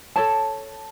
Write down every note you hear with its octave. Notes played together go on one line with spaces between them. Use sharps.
A4 C#5 A5